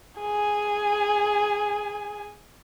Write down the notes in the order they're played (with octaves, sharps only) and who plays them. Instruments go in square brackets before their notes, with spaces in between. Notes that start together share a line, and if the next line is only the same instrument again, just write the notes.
[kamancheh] G#4 G#5